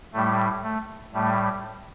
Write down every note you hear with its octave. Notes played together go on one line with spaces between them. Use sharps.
A2 G3 A3
A3
A2 G3 A3